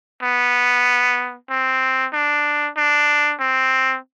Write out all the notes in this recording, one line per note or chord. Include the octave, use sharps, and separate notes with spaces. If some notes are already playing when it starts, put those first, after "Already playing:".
B3
C4
D4
D4
C4